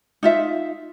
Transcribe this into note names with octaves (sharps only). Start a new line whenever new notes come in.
D#4 F4 E5